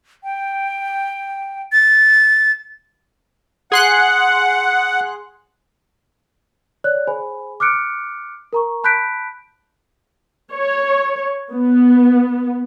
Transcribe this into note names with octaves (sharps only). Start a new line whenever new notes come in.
G5
A6
G#4 F#5 C6 F#6
C#5 D5 F#6
G#4 C5 G#5 B5
D6 F6 F#6 C#7 D7
A#4 A#5 C#6
A5 B5 F#6 G6 B6 D7
C#5
B3